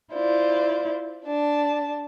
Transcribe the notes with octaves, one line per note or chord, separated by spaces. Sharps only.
E4 F4 C5 D5
D4 A5